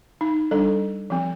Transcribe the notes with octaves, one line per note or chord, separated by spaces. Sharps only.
D#4
G3 D4 A4
F3 C4